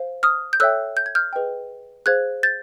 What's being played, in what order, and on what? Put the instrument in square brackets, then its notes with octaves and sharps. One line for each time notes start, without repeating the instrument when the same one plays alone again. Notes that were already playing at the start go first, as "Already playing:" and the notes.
Already playing: [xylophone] C5 F5
D#6 F6
G6
A4 C#5 E5 G5 E6 F#6
G6
G#6
F6 G6
G#4 B4 D#5 G5
G#4 C5 F5 F#6 G#6
G6 A6